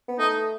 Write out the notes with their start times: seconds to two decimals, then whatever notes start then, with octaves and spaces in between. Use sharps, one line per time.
0.08 B3
0.18 A3 D#4